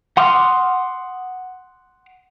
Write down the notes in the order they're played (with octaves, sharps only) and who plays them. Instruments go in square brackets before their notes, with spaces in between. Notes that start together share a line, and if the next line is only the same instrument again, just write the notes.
[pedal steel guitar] F#5 C6 D6 D#6 F6